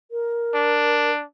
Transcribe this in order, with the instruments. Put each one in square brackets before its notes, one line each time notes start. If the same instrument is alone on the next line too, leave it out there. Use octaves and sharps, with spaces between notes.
[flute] A#4
[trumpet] D4